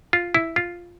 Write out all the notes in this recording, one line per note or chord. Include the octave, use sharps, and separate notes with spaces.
F4
E4
F4